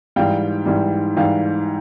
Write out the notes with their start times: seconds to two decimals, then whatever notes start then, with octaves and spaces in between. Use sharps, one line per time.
0.16 G#2 E3 G3 F5 G5
0.66 G#2 E3 G3
1.17 G#2 E3 G3 F5 G5